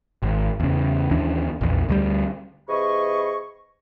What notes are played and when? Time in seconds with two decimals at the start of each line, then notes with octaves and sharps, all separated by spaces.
0.22 G#1
0.60 E2 C#3
1.11 D#2 E3 C#4 D4
1.61 A#1 E2
1.89 D2 F#3 G3
2.68 C3 E3 G#4 D#5 B5 C#6